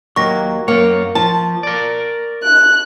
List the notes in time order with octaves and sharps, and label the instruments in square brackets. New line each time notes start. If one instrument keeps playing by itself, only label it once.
[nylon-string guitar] D#2 A#3 [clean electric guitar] F#3 [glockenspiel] C#6 A#6
[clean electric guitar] F#2 C#5 [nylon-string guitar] A#3
[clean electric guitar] F3 [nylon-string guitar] A5
[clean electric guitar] A#4 D5
[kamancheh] F#6